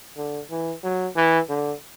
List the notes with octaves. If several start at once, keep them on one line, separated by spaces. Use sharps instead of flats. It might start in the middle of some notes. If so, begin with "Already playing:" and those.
D3
E3
F#3
E3
D3